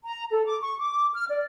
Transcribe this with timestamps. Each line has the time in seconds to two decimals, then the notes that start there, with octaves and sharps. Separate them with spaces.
0.05 A#5
0.31 A4
0.46 D6
0.61 C#6
0.79 D6
1.14 F6
1.29 D5